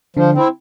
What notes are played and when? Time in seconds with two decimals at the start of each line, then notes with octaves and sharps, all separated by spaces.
0.16 D3 F3 D4
0.34 C4 E4